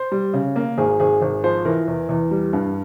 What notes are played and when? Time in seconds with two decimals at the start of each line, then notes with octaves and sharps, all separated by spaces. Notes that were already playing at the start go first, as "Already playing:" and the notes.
Already playing: C5
0.12 G3
0.33 C#3
0.56 A#3
0.78 G#1 G#4
1.00 G#1 G#4
1.21 G#1 G#4
1.44 F3 C5
1.65 E3 A#4
1.88 E2
2.09 E2
2.31 G3
2.53 G2